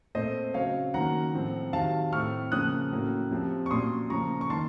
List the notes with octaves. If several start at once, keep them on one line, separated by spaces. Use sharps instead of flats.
A#2 A3 C4 C5 D#5
C#3 F#3 C4 C#5 F5
D#3 F#3 A#3 C#4 F#5 A#5
A2 F3 C4
C3 D#3 F#3 F5 A5
A2 A3 C4 C#6 F6
C#3 F3 A#3 C#4 D#6 F#6
A2 F#3 A#3 C#4
C3 F3 C4
C#6
A#2 F#3 A#3 C#4 C6 D#6
C#3 F3 A#3 C#4 A#5 C#6
C#6
D#3 A#3 A5 C6